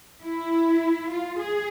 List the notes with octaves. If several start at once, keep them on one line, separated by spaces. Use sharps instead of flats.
E4
F4
G#4